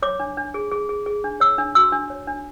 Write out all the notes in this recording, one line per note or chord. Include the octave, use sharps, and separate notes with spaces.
C#5 D6
D4
D4
G#4
G#4
G#4
G#4
D4
C#5 E6
D4
F#4 E6
D4
C#5
D4